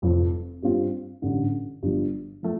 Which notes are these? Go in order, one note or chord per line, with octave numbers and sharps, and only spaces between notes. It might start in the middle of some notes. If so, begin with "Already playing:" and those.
F1 F2 F3
G2 G3 C4 F4
A1 G2 D3
G1 G2 F3
F3 A3